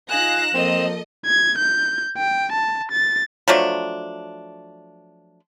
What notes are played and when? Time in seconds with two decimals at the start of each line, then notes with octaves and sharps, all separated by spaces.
0.10 D#4 F4 G#4 F5 F#6 A#6 E7
0.54 A#2 F3 C4 A4 D#5
1.26 G#6
1.58 G6
2.18 G5
2.52 A5
2.91 A6
3.48 F3 F#3 A3 D4